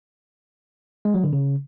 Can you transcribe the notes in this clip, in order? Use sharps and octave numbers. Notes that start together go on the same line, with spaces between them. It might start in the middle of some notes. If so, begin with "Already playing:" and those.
G#3
F#3
D3
C#3